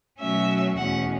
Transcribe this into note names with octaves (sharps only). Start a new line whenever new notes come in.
B2 F#3 A3 C#4 E5
E2 B2 A3 C#4 F#5